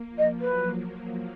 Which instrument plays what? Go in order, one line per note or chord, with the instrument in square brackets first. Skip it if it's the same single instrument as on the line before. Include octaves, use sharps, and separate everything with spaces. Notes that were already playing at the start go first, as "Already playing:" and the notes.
Already playing: [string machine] A#3
F3
[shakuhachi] D#5
[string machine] F#3 [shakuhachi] B4